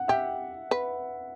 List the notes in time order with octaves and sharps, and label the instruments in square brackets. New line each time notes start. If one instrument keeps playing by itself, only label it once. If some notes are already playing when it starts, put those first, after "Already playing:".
Already playing: [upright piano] F#5
[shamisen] G4 [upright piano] E5
[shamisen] B4